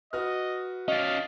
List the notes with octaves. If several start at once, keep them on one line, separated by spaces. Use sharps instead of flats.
F#4 B4 D#5 F6
C#4 D5 D#5 F5